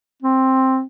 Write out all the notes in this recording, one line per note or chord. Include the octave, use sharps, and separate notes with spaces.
C4